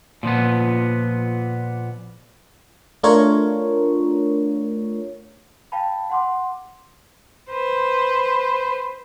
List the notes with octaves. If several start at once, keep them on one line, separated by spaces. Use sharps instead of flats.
A#2 F3 B3
A3 D4 F4 A#4 C#5
F5 G5 A5 B5
F#5 C6 D6
B4 C5